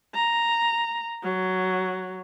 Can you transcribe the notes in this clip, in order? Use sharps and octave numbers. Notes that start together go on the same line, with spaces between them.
A#5
F#3